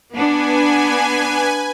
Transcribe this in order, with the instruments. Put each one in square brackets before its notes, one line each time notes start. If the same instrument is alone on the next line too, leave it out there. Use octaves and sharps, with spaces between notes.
[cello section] B3 D4 [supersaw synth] B4 G#5